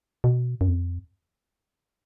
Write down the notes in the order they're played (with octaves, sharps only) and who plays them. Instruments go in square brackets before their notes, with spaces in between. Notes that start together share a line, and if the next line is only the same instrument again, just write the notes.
[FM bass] B2
F#2
F2